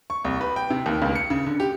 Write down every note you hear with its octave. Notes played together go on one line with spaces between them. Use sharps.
C#6
C2
B4
G5
C3
D#2
C#2
C#7
C#3
D3
G4